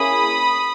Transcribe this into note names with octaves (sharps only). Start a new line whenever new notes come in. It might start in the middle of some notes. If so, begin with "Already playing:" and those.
Already playing: A#3 C#4 E4 G#4 B5 D#6